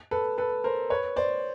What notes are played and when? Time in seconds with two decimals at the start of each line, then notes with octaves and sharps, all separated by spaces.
0.11 A4 B4
0.38 A4 B4
0.64 A#4 C5
0.90 B4 C#5
1.16 C5 D5